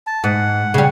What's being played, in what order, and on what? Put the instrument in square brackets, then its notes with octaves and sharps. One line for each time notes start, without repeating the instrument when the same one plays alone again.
[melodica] A5
[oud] G#2 [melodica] F#5
[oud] C#3 G3